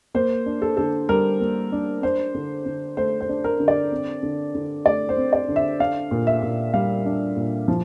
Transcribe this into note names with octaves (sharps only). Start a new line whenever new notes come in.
A#3 C5
D4
A4
D3 A4
G3 A#4
A#3
D4
D4 C5
D3
D3
A3 C5
C5
D4
A#4
D3
D5
C4
D3
D3
A3 D5
C5
C4
D5
D3
E5
D4 F5
A#2
E5
A#2
G3 F5
D4
A#2
F3